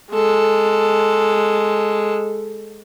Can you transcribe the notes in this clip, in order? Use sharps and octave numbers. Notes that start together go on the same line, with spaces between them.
G#3 A4